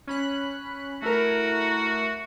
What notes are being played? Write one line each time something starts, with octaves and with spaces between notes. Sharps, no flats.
C#4 B5 F#6
A3 E4 F#4 A#4